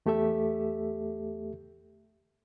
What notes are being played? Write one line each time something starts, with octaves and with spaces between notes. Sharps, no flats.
E2 A3 G4 A4 E5